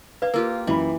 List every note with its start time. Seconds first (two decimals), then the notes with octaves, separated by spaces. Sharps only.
0.22 B4 D5 F5
0.34 A#3 F4 G4 A#4
0.67 F#2 E3 B5